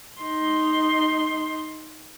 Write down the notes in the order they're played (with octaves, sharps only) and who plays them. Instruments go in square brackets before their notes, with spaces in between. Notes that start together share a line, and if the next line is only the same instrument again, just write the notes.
[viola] D#4 C6